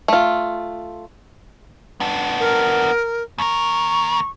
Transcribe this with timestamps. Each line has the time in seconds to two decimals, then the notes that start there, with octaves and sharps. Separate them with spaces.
0.08 A3 F4
2.00 B3 D4
2.40 A#4
3.38 D#2 A#4 C#6